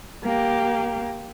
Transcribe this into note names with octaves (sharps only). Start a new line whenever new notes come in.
A#3 G4